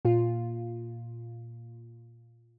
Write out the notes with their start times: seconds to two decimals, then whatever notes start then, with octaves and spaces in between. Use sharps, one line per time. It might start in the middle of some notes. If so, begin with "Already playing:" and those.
0.05 A#2 F4